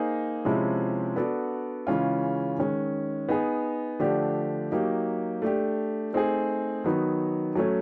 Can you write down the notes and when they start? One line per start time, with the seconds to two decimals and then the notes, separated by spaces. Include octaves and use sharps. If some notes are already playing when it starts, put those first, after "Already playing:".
Already playing: A#3 D#4 G#4 C5
0.45 C3 F3 G#3 C#4 E4
1.16 B3 D4 F#4 A4 D5
1.87 C#3 E3 G#3 C#4 F4
2.58 D#3 G#3 C#4
3.29 B3 D#4 G#4
4.00 D3 F3 A3 D4 G4
4.72 F#3 A#3 D#4 G4
5.42 A3 D4 G4
6.13 A3 C4 D#4 G#4
6.84 D#3 F#3 B3 D#4
7.55 F#3 A3 C#4